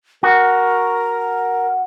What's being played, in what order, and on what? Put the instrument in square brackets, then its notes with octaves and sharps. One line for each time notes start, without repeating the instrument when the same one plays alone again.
[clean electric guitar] F#4 [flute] A#4